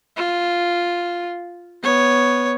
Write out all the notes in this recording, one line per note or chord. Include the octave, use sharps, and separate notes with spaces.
F4
B3 C#5